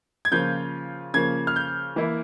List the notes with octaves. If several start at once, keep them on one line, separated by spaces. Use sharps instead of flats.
G#6
C#3 F3 A#3 F4 G6
C#3 F3 A#3 G#6
F6
G6
E3 A#3 E4